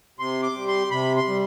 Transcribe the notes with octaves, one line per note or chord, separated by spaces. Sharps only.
C3 C6
D6
G3
C6
C3 B5
C6
G3